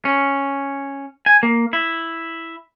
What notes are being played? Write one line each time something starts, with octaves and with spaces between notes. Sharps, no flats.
C#4
G#5
A#3
E4